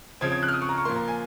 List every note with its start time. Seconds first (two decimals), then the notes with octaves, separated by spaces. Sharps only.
0.21 C#3 F3 C4 G#6
0.32 G#6
0.43 F#6
0.48 F6
0.53 D#6
0.62 C#6
0.69 A#5
0.78 C#6
0.85 A#2 F3 A#3 C6
0.96 A#5
1.08 G#5